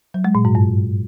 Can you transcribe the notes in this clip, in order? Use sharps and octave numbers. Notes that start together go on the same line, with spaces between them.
F#3
G#3
A#2
G#2
G2